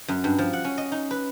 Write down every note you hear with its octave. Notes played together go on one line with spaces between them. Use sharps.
F#2
G2
F3
F#5
C#4
D#5
D#4
B4